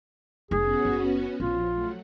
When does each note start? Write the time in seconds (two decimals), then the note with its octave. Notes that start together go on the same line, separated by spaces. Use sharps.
0.51 F1 F2 B3 C#4 F#4 G#4
0.85 F#1
1.40 A#1 F3 F4
1.70 F#3 A3 F#4